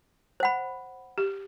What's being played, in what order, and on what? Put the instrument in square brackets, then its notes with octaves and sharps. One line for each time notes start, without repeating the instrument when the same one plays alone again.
[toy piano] C5 F#5 B5
[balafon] G4